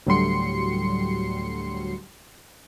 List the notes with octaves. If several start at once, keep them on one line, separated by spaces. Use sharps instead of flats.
D2 A2 F#3 G3 C6 C#7